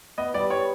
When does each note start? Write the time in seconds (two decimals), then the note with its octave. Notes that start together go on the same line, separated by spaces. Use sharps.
0.18 B3 D#5
0.34 G3 D5
0.50 G3 C#5